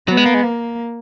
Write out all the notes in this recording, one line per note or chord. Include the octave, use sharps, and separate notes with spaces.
F#3 B3
G#3
A#3
G#3
A#3